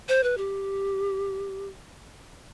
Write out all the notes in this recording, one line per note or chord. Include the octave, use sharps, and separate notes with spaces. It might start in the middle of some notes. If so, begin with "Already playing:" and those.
C5
B4
G4